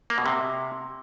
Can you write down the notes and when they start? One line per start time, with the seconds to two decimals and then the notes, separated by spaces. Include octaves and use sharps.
0.10 A#3
0.18 B2
0.26 C3